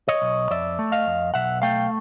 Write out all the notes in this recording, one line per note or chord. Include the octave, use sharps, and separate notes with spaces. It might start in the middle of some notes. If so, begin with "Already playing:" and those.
C#5 D#5
B1
F2 D5 E5
A3
D#5 F5
F2
B1 E5 F#5
A3 F5 G5